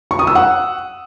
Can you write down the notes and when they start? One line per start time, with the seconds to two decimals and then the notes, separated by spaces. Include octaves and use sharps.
0.11 C#6
0.19 D#6
0.27 E6
0.35 F#5